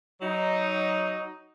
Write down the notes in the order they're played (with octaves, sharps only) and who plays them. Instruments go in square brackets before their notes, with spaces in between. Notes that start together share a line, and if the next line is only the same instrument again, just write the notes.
[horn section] F#3 D#4